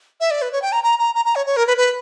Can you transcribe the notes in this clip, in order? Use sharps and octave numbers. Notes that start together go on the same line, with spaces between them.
E5
D5
B4
C#5
G5
A#5
A#5
A#5
A#5
A#5
C#5
C#5
A#4
B4
B4